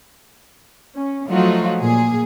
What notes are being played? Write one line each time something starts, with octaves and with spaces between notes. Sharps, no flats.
C#4
F3 F#3 A3 D#4 F4 F#4
A#2 G#4